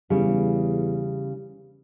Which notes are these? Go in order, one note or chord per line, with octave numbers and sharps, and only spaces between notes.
E2 C#3 G3